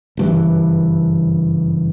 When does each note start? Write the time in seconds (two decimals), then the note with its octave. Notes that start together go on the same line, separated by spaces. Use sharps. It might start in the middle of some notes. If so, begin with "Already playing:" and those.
0.17 F#1 G2 E3